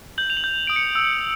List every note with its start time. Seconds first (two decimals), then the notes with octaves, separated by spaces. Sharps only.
0.18 G6 F#7
0.30 F7
0.37 F#7
0.44 G6
0.67 D#6 D7
0.76 C#7
0.95 E6